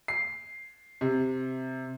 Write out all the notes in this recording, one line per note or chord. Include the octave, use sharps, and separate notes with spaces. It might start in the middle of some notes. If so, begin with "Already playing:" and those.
C7
C3